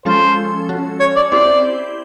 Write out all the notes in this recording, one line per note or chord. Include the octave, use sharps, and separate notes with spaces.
F3 G#3 C#4 F4 A4 C5
C#4 F#4 A4
C#5
D5
C4 E4 G4 C5 D5